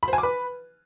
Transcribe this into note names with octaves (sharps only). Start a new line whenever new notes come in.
B5
C5
G#5
D6
B4